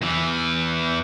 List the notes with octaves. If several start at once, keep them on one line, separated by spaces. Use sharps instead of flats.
E2 E3